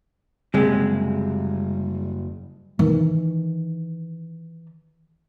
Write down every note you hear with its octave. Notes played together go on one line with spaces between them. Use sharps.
F#1 C3 G3 G#3
D#3 E3